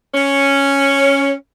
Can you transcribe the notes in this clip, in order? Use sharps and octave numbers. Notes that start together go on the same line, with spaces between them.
C#4